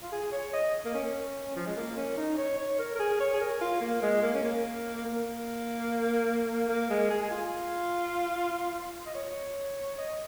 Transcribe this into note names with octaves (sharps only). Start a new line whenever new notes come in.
F4
G#4
C#5
D#5
A#3
C#4
F3
G#3
A#3
C#4
D#4
C#5
C#5
A#4
A#4
G#4
C#5
G#4
A#4
F4
A#3
G#3
A#3
C#4
A#3
A#3
A#3
G#3
G#4
G#4
F4
D#5
C#5
D#5